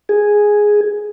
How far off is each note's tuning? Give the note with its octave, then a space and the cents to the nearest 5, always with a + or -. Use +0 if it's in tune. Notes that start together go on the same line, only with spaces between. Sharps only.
G#4 +0